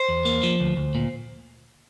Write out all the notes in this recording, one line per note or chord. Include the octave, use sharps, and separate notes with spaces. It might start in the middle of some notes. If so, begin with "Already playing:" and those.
Already playing: C5
E2
A#3
F3
D2
D2
A#2